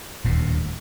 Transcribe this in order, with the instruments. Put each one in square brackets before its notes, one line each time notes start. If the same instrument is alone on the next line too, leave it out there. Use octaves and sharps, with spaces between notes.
[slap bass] D#1 D2 A2